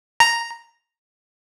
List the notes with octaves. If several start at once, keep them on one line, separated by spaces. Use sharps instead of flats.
A#5